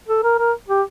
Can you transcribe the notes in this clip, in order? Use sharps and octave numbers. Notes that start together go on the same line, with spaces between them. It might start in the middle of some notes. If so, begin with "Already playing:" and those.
A4
A#4
A#4
G4